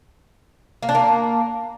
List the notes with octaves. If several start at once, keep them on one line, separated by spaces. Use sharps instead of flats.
A#3
D4
A#3